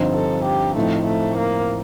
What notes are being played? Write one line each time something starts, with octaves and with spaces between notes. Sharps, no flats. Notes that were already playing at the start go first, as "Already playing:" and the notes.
Already playing: G2 D3 F3 C4 D#4
A4
G4
A2 F3 A3 C4 D#4
A3
A#3